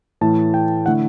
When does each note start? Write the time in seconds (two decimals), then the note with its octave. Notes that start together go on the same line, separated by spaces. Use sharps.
0.21 A2 E3 A3 E4 A5
0.54 G5
0.86 D3 A3 E4 F#5